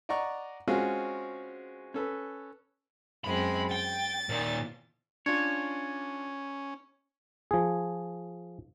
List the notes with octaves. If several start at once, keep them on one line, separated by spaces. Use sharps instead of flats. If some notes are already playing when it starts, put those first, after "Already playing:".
D5 D#5 F#5 A#5 C#6
G#3 C4 C#4 F4 F#4 G#4
C#4 A4 B4
F#2 G#3 C4 B5
G5 A6
A#2 D#3
C#4 D4 F4 C#5
F3 G#4